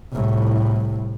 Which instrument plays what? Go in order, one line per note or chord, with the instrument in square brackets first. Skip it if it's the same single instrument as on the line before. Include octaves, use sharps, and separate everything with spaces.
[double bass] C2 A2